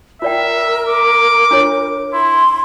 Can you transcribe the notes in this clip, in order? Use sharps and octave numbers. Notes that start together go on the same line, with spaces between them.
F4 A#4 D5 E5 G5
D6
D4 F4 C#5
E4 C6